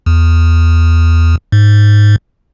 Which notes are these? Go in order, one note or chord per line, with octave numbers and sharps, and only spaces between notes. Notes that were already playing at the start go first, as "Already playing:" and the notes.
E2
G#2